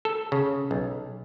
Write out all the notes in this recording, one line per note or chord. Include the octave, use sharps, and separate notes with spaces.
A4
C#3
B1